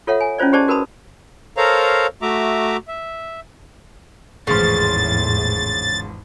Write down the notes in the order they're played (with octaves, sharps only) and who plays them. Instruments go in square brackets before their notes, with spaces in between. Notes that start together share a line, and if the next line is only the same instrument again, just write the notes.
[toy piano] F4 A4 C#5 E5 F#5
G#5
C#4 E4 F4 C5 D5
G4 G#4 C5 D5 D#5 A5
F#4 A#4 B4 A5 B5 D#6
[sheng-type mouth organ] A4 A#4 C5 C#5 F5 A#5
A3 F#4 E5 A#5 D6
E5
[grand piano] G#1 F3 C6 [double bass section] E2 A2 E3 [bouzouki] C#3 [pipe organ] A6